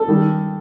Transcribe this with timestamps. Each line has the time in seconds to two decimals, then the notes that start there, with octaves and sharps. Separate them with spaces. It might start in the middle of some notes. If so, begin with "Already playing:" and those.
Already playing: A4
0.08 D#3 G3